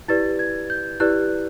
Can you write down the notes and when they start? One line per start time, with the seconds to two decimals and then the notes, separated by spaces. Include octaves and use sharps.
0.08 E4 G4 B4 D5 A6
0.39 G#6
0.70 G6
1.00 E4 G4 B4 D5 F#6